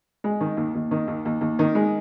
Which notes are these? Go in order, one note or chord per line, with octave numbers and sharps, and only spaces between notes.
G#3
D#3
D#2
D#2
D#3
D#2
D#2
D#2
D#3
G#3